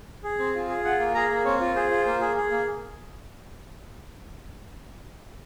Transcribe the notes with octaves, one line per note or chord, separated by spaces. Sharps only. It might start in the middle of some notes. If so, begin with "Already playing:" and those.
G#4
C4
F4
G#4
F4 F#5
A#3
G#4 A#5
A#3
C4 C#5
F4
G#4 C5
F4
A#3
G#4
G#4
A#3